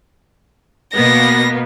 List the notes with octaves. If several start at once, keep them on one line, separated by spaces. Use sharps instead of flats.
B2 A#3 B3 A#6